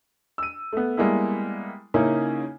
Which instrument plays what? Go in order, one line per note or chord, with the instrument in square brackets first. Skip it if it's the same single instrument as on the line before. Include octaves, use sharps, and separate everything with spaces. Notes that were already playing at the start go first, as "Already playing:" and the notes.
[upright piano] E6 D#7
A3 B3
G3 G#3 A#3 B3 E4
C#3 A#3 C#4 D#4 E4